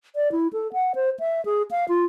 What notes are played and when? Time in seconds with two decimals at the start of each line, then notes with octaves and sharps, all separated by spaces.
0.16 D5
0.32 E4
0.53 A4
0.73 F#5
0.95 C5
1.20 E5
1.45 G#4
1.71 F5
1.89 F4